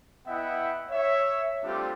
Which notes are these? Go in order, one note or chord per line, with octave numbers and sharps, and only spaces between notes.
B3 E4 D#5 E5 F#5 G5
C#5 E5
G3 A3 C4 D4 F4 G4